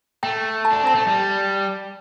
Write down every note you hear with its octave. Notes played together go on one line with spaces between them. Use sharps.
A3 G5
A5
D4
C4 A5
A3
G3